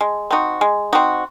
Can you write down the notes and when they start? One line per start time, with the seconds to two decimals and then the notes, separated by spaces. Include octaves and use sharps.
0.01 G#3
0.31 C4 D#4 F#4
0.61 G#3
0.93 C4 D#4 F#4